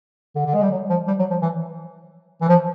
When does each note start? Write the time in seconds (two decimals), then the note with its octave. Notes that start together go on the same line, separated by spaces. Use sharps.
0.36 D3
0.46 D3
0.54 G#3
0.62 G3
0.72 F#3
0.89 F3
1.07 G3
1.19 F#3
1.30 F3
1.42 E3
2.41 E3
2.49 F3